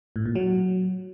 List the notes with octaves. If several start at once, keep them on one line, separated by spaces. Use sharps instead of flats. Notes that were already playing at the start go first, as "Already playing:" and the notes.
A2
A#2
F#3